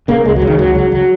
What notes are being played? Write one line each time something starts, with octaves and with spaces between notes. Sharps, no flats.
C#3 A#3
C#2 G#3
F#3
C#3
D#3
C#2 F#3
C#3 F#3
F#3